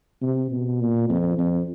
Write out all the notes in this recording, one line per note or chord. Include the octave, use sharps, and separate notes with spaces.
C3
B2
A#2
F2
F2